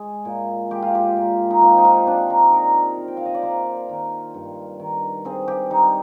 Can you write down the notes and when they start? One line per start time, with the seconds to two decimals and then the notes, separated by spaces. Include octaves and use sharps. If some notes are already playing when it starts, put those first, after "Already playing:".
Already playing: G#3 G#4
0.25 A#2
0.71 G#3 G4
0.83 F4
0.95 G4
1.17 A#2
1.51 D#4
1.61 C4 F4
1.78 D#4
1.85 F4
2.07 C4 D4
2.30 D#4
2.52 A#2 A#4
2.98 C4
3.08 G5
3.17 F5
3.26 D#5
3.34 D5
3.43 A#3 C5
3.89 D#3
4.34 G2
4.80 D#3
5.25 C4 G#4
5.48 G4
5.70 G3 D#4